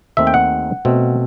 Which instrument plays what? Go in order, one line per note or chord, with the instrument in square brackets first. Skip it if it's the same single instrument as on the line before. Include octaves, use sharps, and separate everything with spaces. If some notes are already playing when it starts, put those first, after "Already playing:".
[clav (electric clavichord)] D#2 D#3 A3 C4 E5
G5
F#5
B2 A3 C4